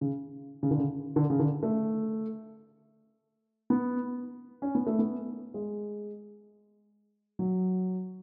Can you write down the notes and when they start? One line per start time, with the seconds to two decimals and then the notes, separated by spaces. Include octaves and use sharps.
0.01 C#3
0.63 C#3
0.71 D3
0.78 C#3
1.16 D3
1.30 C#3
1.39 D3
1.63 A3
3.70 B3
4.62 C#4
4.75 B3
4.87 A3
4.99 B3
5.54 G#3
7.39 F#3